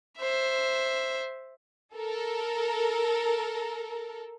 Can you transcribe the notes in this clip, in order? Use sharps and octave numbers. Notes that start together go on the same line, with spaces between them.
C5 E5
A4 A#4